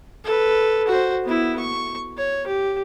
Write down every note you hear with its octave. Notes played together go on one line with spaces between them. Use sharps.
A4 B4
F#4 C5
B3 E4
C#6
C#5
G4